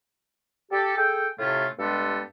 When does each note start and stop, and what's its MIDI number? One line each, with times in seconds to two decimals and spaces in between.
0.72 0.96 67
0.72 0.96 69
0.97 1.27 68
0.97 1.27 69
0.97 1.27 79
1.38 1.66 45
1.38 1.66 48
1.38 1.66 57
1.38 1.66 61
1.38 1.66 65
1.79 2.23 43
1.79 2.23 56
1.79 2.23 59
1.79 2.23 67
1.79 2.23 69